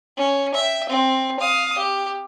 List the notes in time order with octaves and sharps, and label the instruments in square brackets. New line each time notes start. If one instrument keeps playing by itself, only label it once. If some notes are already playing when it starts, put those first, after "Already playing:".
[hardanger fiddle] C#4
E5 G5
C4
F5 D#6
G4